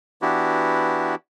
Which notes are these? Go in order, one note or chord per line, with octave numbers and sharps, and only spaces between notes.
E3 B3 D4 E4 F#4 G4